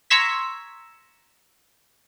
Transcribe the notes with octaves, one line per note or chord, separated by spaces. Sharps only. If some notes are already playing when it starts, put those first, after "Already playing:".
A#5 C6 C#6 E6 G#6 B6